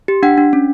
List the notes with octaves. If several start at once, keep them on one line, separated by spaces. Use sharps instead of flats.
G4
D4 F#5
D4
C#4